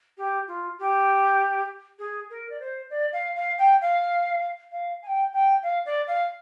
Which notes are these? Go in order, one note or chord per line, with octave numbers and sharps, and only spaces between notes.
G4
F4
G4
G#4
A#4
D5
C5
D5
F5
F5
G5
F5
F5
G#5
G5
G5
F5
D5
F5